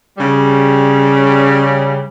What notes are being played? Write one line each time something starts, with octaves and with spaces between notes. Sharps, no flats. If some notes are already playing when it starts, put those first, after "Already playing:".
C#3 G3